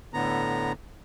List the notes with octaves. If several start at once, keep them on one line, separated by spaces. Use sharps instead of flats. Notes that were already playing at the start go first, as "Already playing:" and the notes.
A2 D3 B3 A#5